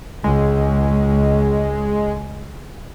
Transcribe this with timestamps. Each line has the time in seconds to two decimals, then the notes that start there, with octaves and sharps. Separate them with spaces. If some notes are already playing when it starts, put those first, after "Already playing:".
0.24 C#2 G#3